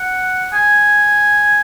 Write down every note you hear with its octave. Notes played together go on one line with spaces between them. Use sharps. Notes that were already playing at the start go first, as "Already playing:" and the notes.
Already playing: F#5
G#5